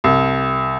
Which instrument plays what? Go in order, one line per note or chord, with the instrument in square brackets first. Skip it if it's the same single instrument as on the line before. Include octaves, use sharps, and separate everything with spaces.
[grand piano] C2